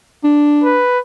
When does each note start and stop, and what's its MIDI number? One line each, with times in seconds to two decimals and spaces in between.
0.24 0.83 62
0.64 0.99 71